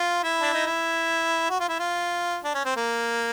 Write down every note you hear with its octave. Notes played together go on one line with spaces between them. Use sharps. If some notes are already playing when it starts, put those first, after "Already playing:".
Already playing: F4
E4
D4
D#4
E4
F#4
F4
E4
F4
D4
C#4
C4
A#3